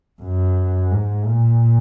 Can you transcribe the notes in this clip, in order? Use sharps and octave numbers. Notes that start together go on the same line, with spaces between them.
F#2
G#2
A#2